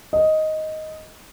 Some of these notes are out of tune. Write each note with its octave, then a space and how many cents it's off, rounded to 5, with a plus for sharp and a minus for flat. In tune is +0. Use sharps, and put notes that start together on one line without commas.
D#5 +5